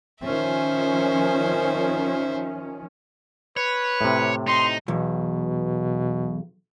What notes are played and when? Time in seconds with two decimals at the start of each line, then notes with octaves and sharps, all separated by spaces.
0.21 D#3 F3 C#4 C5 E5
3.57 B4 C#5
4.01 A2 C3
4.47 D#4 C6
4.88 B1 E2 B2